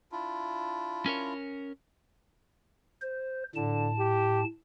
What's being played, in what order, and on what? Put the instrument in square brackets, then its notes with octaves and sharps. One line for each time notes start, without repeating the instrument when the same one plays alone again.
[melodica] D4 E4 F4
[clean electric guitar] C#4 A#4 C#5
[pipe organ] C5
[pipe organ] A2 A5 [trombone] D3
[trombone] G4